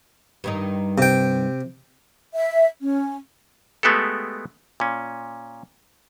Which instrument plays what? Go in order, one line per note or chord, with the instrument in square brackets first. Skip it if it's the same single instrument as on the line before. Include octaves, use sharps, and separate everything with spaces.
[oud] G2 D#3 D#4
[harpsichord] C3 G5
[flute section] E5
C#4
[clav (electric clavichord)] G#3 A3 B3 F#4 G4 A4
A#2 C#4